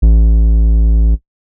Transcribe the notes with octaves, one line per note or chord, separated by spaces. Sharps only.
A1